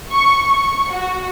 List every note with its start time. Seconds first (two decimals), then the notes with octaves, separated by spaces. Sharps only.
0.11 C#6
0.44 C#6
0.91 F#4